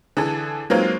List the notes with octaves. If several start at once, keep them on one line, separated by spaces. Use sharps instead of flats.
D3 E3 G#4 A4
F#3 G#3 A#3 C4 D#4 F4